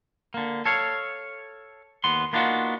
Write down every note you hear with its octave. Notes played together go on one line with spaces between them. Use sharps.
D3 A#3
A4 C#5 F5
D#2 B3 C6
A#3 B3 D4 D#4 F4 F#4